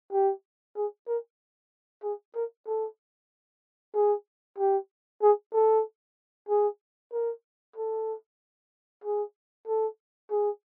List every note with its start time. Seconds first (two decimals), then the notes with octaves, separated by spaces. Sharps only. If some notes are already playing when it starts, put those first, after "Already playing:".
0.13 G4
0.77 G#4
1.08 A#4
2.04 G#4
2.35 A#4
2.67 A4
3.95 G#4
4.58 G4
5.22 G#4
5.54 A4
6.49 G#4
7.13 A#4
7.76 A4
9.04 G#4
9.68 A4
10.31 G#4